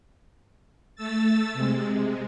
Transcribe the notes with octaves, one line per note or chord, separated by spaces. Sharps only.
A3 E6 A6
C3 G#3